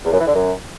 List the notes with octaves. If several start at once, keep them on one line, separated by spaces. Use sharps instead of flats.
E2
F#2
E3
D3
F#2